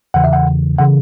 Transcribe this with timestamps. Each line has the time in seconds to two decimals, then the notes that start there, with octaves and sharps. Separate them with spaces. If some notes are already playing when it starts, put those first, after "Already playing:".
0.14 E2 C#3 E3 F#5
0.24 E5
0.33 F#5
0.79 C#3 E3 F#5